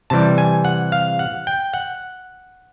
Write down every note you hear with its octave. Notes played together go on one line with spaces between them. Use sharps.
C3 E3 G3 A5
G#5
F#5
F5
F#5
G5
F#5